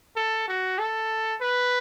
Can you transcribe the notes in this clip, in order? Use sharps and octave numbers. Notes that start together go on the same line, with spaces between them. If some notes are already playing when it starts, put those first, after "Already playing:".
A4
F#4
A4
B4